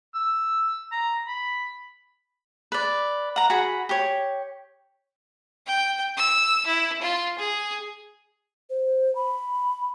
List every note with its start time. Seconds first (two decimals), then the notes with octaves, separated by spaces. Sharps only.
0.15 E6
0.92 A#5
1.27 B5
2.72 B4 D5
3.36 F#5 A#5
3.50 F#4 G#4 F#5 B5
3.89 G4 C#5
5.67 G5
6.18 E6
6.67 E4
7.02 F4
7.39 G#4
8.70 C5
9.15 B5